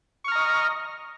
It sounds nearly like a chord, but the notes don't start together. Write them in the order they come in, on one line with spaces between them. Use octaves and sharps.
C#6 F6 A#5 D#5